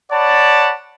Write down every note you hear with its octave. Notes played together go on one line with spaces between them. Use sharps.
C#5 D5 F#5 A5 B5